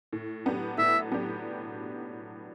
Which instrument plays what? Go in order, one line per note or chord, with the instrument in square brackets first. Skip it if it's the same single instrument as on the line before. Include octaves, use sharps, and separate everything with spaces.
[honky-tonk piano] A2
F#3 B3 D4 G4
[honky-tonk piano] A2 [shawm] E5
[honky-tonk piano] F#3 B3 D4 G4